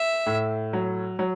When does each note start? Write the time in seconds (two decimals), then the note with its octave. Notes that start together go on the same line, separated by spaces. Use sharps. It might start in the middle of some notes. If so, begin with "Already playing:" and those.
Already playing: E5
0.26 A2
0.73 F#3
1.19 F#3